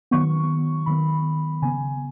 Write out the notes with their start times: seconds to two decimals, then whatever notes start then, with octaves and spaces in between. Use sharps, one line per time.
0.11 D#3 F#3 B3 C#6
0.86 D#3 F#3 B3 B5
1.62 C#3 B3 G#5